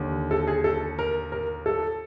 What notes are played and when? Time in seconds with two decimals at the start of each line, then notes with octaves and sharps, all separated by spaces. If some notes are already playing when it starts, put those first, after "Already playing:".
Already playing: D#2 D3
0.31 A4
0.48 G#4
0.64 A4
0.99 A#4
1.32 A#4
1.66 A4